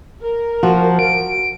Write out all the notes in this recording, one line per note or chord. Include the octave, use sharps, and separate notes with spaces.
A#4
F3 F#4
D7